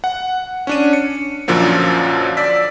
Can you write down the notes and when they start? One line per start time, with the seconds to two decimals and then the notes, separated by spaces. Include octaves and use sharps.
0.04 F#5
0.67 C#4 D4 D#7
0.93 C#7
1.48 F#2 A#2 D3 F3 F#3
2.37 D5 E6 B6